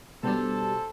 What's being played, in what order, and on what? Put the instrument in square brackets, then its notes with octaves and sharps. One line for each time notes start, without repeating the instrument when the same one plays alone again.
[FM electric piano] B2 G3 D4 [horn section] A4 C5 A5